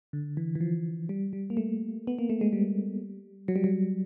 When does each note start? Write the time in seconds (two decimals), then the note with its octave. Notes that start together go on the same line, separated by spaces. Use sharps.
0.13 D3
0.37 E3
0.55 E3
0.61 F3
1.09 G3
1.33 G3
1.50 A#3
1.57 A3
2.07 B3
2.19 A#3
2.30 A3
2.41 G#3
2.53 G3
3.48 F#3
3.56 G3
3.64 F#3